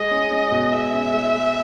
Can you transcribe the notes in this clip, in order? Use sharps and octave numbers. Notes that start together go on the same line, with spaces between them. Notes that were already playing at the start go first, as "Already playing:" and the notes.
Already playing: G#3 D#5
C#4
C#4
B2
G#3 E5
C#4
G#3
G#3